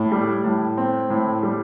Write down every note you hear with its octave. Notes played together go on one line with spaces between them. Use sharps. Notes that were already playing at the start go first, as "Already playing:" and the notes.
Already playing: A2
G3
A2
C4
A2
G3